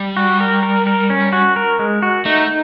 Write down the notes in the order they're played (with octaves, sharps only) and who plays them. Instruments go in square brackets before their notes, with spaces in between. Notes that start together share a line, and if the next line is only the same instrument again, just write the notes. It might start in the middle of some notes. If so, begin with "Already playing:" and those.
Already playing: [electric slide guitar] G3
[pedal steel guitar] F#4
A#4
A#4
A#4
C#4
F#4
A#4
G#3
F#4
[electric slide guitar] A3 [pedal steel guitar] D#4